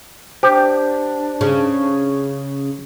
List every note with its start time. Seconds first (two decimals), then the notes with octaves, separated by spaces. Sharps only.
0.43 D4 G4 C5
1.41 C#3